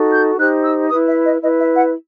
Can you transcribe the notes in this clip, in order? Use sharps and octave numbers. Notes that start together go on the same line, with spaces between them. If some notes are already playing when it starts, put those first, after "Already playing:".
Already playing: D#4 F#4 A4
G6
D#4 G4 C5 F#6
E6
E4 B4 D#6
E5
D#5
E4 B4 D#5
E5
F#5